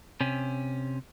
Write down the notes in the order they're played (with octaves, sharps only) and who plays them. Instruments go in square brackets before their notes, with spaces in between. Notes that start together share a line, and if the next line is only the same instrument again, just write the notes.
[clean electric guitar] C3 C#4